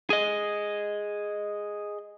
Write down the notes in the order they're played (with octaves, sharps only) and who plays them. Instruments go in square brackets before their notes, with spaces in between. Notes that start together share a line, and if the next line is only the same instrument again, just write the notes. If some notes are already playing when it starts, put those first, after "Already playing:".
[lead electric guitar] G#4 D#5